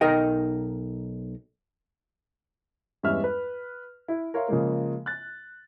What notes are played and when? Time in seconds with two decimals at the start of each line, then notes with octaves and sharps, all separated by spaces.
0.01 B1 D#4 A#4 D#5 G5
3.03 E2 G2 G#3 C#4 E5 F6
3.24 B4
4.08 E4
4.34 A#4 C#5 E5 F5 C6
4.48 C#3 F3 G#3 A#3
5.06 F#6 A6